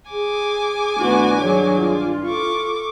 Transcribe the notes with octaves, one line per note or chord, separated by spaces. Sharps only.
G#4 G#5 D6
G2 D#3 A3 B3 D4 F#4
F#3 G#4 C#5
F4
A4 C#6 D6